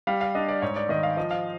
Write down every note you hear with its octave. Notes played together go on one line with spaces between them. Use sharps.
G3 F5
F5
D4 D#5
D5
G#2 C#5
D5
D#3 D#5
F5
F3 D#5
F5